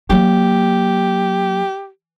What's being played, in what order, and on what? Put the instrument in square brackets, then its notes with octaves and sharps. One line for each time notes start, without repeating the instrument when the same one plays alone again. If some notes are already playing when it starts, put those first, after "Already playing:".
[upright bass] F#3 A#3 [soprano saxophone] G4